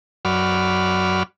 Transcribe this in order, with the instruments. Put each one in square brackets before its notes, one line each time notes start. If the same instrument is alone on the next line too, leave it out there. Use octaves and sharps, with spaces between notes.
[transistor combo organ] F#2 F#3 D5 B5 F6